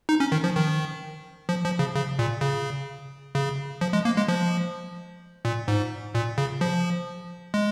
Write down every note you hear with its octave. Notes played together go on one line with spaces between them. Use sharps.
D#4
C#4
D#3
F3
D#3
F3
F3
C#3
C#3
A#2
C#3
C#3
F3
G#3
A#3
G#3
F3
A#2
G#2
A#2
C#3
F3
G#3